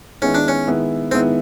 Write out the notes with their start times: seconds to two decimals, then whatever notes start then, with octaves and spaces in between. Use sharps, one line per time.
0.22 D#3 G#3 B3 C#4 E4
0.34 D4
0.48 C#4
0.67 D#3 G#3 B3 E4
1.11 D#3 G#3 B3 C4 E4